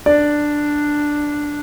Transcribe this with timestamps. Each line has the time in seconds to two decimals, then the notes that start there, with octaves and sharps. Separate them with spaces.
0.06 D4 D5